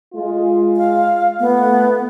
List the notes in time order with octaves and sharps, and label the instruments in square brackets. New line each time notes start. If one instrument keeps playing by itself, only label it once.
[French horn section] G#3 F4
[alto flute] F5
[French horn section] A3 [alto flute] B3